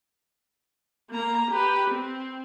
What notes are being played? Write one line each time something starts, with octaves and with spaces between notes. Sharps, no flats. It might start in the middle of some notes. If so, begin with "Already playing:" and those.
A#3 A#5
G4 B4
C4